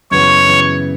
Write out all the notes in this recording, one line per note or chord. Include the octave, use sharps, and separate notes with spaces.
F#2 C#3 E3 B3 C#5
F#2 C#3 E3 B3